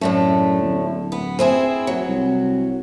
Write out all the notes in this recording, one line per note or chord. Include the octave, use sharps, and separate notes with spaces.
F#2 A2 D3 A3
D1
B3
C4 E4 G#4
F#3
C2